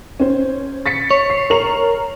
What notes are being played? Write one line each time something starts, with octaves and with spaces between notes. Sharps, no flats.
C#4 C5
A6 B6 C#7
C#5
C7
A#4 F7